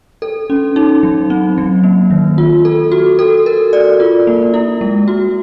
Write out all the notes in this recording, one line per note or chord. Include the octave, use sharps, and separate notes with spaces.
A4
C#4
D#4
F#3
C4
F#3
A#3
D#3
F4
A4
F#4
A4
A#4
D5
F4
A#3
E4
G#3
F#4